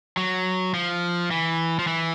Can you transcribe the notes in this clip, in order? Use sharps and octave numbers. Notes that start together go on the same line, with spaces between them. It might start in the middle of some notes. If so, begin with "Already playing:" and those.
F#3
F3
E3
F3
E3